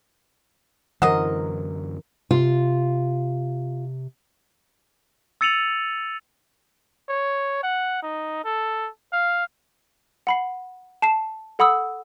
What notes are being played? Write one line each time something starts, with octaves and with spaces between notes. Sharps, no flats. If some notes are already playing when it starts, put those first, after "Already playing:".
F#2 D3 E3 F#3 A#4 C5 D#5 F#5
C3 F4
E6 A6 C#7 D#7 F7 F#7
C#5
F#5
D#4
A4
F5
F#5 B5 C7
A5 C7 E7
A4 F#5 B5 D#6 E6